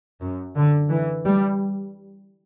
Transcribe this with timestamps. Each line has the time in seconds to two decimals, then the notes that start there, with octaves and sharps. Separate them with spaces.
0.21 F#2
0.56 D3
0.90 E3
1.25 G3